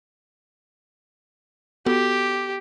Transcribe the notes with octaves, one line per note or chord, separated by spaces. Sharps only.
B3 F#4 G4 A4